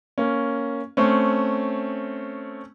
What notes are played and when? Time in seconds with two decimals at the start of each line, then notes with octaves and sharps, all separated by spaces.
0.18 A#3 C#4
0.97 A3 C4 C#4